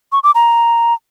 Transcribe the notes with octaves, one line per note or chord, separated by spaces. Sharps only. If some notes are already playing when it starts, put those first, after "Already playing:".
C#6
D6
A#5